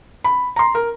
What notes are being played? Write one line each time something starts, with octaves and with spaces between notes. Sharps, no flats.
B5
A#5 C6
A#4